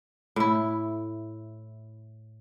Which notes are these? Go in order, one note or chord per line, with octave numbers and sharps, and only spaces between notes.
A2 E4